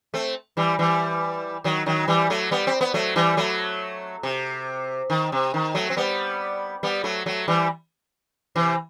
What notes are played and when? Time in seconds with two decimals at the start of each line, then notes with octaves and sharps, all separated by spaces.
0.14 A3 C4
0.57 E3 G3
0.79 E3 G3
1.64 D#3 F#3
1.86 D#3 F#3
2.08 E3 G3
2.30 F#3 A3
2.51 G3 B3
2.67 C4
2.81 B3
2.94 F#3 A3
3.16 E3 G3
3.37 F#3 A3
4.23 C3
5.10 D#3
5.32 C3
5.54 D#3
5.74 F#3 A3
5.90 C4
5.97 G3 B3
6.83 G3 B3
7.04 F#3 A3
7.26 F#3 A3
7.48 E3 G3
8.56 C3 E3